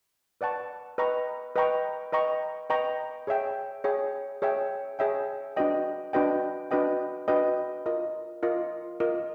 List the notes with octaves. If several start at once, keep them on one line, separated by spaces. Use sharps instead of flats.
B4 D5 F#5 A5 C#6
B4 D#5 G5 A#5 C#6
B4 D#5 G5 A#5 C#6
B4 D#5 G5 A#5 C#6
B4 D#5 G5 A#5 C#6
G#4 C#5 E5 G5
G#4 C#5 E5 G5
G#4 C#5 E5 G5
G#4 C#5 E5 G5
D4 F#4 B4 D#5 G5
D4 F#4 B4 D#5 G5
D4 F#4 B4 D#5 G5
D4 F#4 B4 D#5 G5
F4 A#4 D#5
F4 A#4 D#5
F4 A#4 D#5